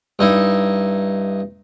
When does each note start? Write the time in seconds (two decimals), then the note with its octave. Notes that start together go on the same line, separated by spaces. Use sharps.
0.19 G2 D#4 E4